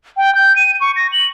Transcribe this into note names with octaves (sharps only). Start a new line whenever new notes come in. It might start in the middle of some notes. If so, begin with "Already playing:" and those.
G5
G6
D#7
C#6
A#6
F#7